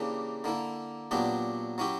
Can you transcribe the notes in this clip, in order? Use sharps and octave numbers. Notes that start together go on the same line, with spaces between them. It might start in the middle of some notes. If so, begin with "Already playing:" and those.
Already playing: C#3 E3 A#3 D4 G4
D3 A#3 E4
A#2 F#3 B3 D4 G4
F#3 C#4 E4 G4